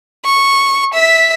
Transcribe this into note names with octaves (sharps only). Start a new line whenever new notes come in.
C#6
E5 B6